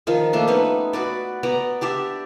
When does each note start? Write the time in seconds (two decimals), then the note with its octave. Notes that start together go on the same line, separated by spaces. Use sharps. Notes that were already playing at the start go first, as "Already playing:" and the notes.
0.07 D#3 F3 D#4
0.33 A3 A#3 D4
0.48 B3 C#4 D#4 B4
0.93 F#4 B4 D5
1.43 B3 D5 A#5
1.81 D4 G4 D5 E5